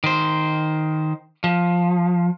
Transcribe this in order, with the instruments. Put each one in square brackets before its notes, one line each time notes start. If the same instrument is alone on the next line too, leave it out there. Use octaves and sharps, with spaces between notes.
[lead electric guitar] D#3 C5
F3